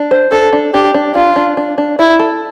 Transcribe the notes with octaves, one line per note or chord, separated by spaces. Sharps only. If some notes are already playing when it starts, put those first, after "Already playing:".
Already playing: D4
C5
D4 A4
D4
D4 G4
D4
D4 F4
D4
D4
D4
E4 D5
A4